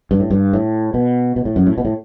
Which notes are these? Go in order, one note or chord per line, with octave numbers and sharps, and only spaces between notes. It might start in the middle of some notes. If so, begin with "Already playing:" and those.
G2
A2
G2
A2
B2
B2
A2
F#2
A2
B2
A2